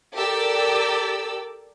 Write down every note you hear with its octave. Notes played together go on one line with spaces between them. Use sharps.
G4 A4 A#4 D5 D6 E6